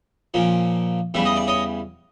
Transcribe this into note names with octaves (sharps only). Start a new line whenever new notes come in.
A#2 F3 A#3 C#4
E2 C#3 E3 G3 E5
D#5
D5
C#5 D#5